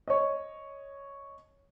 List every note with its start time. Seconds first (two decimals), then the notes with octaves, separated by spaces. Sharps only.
0.08 C#5 D#5